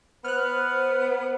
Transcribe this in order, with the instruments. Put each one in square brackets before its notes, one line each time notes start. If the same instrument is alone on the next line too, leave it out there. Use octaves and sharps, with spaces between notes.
[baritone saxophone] B3 [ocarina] C5 [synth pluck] F6 F#6